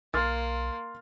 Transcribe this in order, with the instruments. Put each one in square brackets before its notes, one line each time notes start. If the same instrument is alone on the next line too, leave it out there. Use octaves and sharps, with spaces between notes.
[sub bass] B1 [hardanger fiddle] A#3 [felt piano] C6 F6 A6